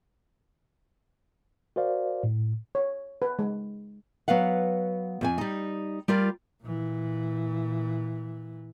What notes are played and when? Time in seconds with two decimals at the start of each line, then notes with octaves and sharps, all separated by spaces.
1.76 F#4 A#4 C5 D5 F5
2.23 A2
2.75 C#5
3.22 B4
3.39 G#3
4.28 F#3 B3 B4 F5 F#5
5.21 F2 C4 G#5
5.38 G3 D#4
6.08 G3 F4 A#4 D5
6.62 A#2 E3